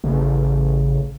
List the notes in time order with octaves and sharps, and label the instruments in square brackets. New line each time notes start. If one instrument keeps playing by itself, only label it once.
[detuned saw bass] A1 [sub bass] C#3